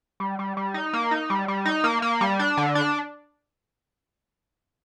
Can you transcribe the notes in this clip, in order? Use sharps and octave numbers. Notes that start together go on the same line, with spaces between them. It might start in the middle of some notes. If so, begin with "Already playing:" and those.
G3
G3
G3
D#4
A#3
D#4
G3
G3
D#4
A#3
A#3
G3
D4
D3
D4